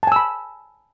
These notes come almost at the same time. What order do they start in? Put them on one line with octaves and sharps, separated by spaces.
A5 G#5 E6 B5